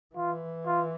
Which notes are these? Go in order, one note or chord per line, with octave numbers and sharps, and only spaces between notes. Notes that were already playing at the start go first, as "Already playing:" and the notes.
E3 F4
F4